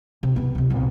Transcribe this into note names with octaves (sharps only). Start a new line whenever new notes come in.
C3
C3 B3
C2 C3
C2 A#2